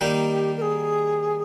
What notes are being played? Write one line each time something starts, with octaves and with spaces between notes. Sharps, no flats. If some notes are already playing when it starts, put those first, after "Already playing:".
D#3 G3 A#3 D#4 G4
A#4
G#4